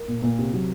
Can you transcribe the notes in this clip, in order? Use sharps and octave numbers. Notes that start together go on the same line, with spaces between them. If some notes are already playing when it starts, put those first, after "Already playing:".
Already playing: A#4
A#2
A#2
C3
F#3